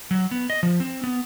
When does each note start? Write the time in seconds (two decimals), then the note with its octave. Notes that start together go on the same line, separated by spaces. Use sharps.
0.11 F#3
0.31 B3
0.50 D#5
0.63 F3
0.80 C4
1.04 B3